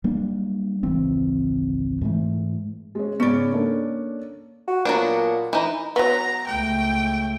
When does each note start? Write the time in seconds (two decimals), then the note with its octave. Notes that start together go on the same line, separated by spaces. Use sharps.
0.04 F#3 G3 A#3 D4
0.83 G#1 C#2 E3 C4
2.01 G#2 E3 G#3 A3
2.95 G#3 C#4
3.20 G#2 C#3 B3 C#4 D5
3.52 A#3 D4 A4
4.67 F#4
4.85 A#2 F#3 B3 D4
5.53 E3 D#4
5.96 F#3 B3 A#5
6.47 C#2 A3 G5